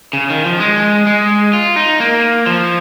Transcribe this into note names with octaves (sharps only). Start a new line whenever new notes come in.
C#3
D#3
F3
G#3
G#3
F4
D#4
A#3
F3